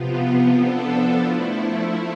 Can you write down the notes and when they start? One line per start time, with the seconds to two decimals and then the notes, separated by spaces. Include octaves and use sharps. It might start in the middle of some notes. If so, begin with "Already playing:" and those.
Already playing: C3 F3 B3 F4
0.52 F3 B3 D4 A4
1.19 F3 A3 E4